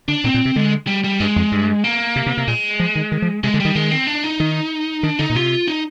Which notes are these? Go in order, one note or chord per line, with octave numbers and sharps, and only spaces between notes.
D3 D4
A#2 C4
A#2
C3
D3 G#3
G3
G3
G2 G#3
F2
G2
A#3
C3
C3
C3
A#2 G#3
F3
D#3
D#3
F3
C3 G#3
D3
D#3 G3
D#3 G#3
C4
D4
D#4
D#3
D#3 D4
D3 D#4
A#2
C3 F4
D#4